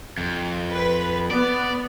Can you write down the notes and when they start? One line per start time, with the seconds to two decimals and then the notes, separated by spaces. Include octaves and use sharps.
0.18 F2
0.71 B4
1.31 B3 D5